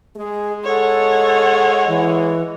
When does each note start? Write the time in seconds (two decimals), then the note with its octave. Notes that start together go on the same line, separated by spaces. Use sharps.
0.17 G#3 G#4
0.65 A4 C#5 F#5
1.87 E3 G#3